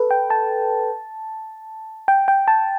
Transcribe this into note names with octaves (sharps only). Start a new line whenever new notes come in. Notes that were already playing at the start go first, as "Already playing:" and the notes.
Already playing: A4 B4
G5
A5
G5
G5
A5